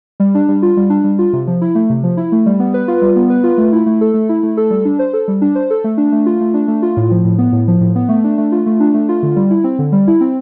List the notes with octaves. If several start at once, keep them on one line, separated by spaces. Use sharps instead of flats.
G3
D4
G3
F4
G3
D4
G3
F4
C3
F3
E4
A3
C3
F3
E4
A3
G3
B3
B4
F4
G3
B3
B4
F4
A3
E4
A3
A4
A3
E4
A3
A4
G3
D4
C5
A4
G3
D4
C5
A4
A3
D4
A3
F4
A3
D4
A3
F4
A2
F3
A2
B3
A2
F3
A2
B3
A3
D4
A3
F4
A3
D4
A3
F4
D3
G3
E4
C4
D3
G3
E4
C4